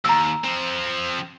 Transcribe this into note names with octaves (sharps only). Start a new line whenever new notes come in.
D#2 A#5 E6
F3 C4